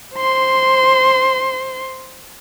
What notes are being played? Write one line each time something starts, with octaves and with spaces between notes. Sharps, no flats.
C5 C6